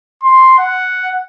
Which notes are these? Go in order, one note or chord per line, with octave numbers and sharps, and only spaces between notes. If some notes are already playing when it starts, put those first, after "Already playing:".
C6
F#5